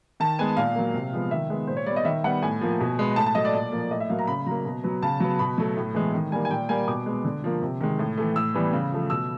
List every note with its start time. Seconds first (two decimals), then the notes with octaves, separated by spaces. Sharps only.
0.20 D#3 A5
0.39 G#3 B3 G#5
0.57 A#2 F5
0.75 F#3 A#3
0.94 C3
1.13 F3 G#3 B3
1.31 D#3 E5
1.50 G#3 B3
1.67 A#2 C5
1.77 C#5
1.86 G3 B3 D5
1.96 D#5
2.05 D#3 E5
2.24 G3 B3 F#5
2.42 A2 G#5
2.61 F3 A#3
2.80 B2
2.99 G#3 B3
3.16 A2 A5
3.26 A5
3.35 F#3 A3 D#5
3.45 D5
3.54 A#2
3.72 F3 A#3
3.91 A2 D#5
4.00 E5
4.10 F#3 A#3 F5
4.19 A#5
4.27 C#3 B5
4.46 F#3 A#3 A#5
4.65 B2
4.84 F#3 B3
5.03 C#3 A5
5.20 F#3 B3
5.39 B2 B5
5.58 F#3 A3
5.77 A2
5.94 E3 G#3 B3
6.14 D#3
6.32 G3 A#3 G#5
6.45 G#5
6.51 A#2 G5
6.69 G3 A#3 G#5
6.87 B2 D6
7.06 G#3 B3
7.24 D3
7.44 F3 A#3
7.62 C3
7.81 D#3 G#3
7.99 A2
8.18 E3 A3
8.36 A2 E6
8.55 E3 G3 B3
8.73 C#3
8.92 F3 A3
9.10 B2 E6